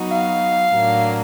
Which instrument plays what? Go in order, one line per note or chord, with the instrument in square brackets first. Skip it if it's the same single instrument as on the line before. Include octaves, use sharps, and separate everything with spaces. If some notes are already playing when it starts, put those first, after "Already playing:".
Already playing: [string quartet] F#3 B3 D#4 F#4
[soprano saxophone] F5
[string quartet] A2 F#3 A#3 D4